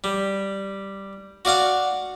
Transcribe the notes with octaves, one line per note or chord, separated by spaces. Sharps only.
G3
F#4 D5 F5 F#5